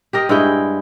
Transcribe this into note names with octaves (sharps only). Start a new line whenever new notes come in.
G4 A#4 D#5
G2 G#3 E4 G5